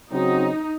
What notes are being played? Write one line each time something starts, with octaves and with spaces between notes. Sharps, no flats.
C#3 F#3 C4 D#4 F#4